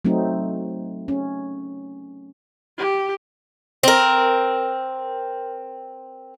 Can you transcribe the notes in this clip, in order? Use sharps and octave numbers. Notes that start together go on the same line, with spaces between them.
F#3 A3 C4 D#4
C#4
G4
C4 A#4